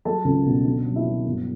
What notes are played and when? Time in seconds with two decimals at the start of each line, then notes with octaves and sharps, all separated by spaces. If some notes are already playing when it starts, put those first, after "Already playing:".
0.05 F#3 A4 A5
0.25 C#2
0.46 B2
0.65 D3
0.85 F#3
0.96 E4 E5
1.05 F#3
1.26 G1